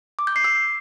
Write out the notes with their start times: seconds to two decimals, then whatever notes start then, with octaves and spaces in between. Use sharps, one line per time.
0.19 D6
0.27 G6
0.36 C7
0.44 E6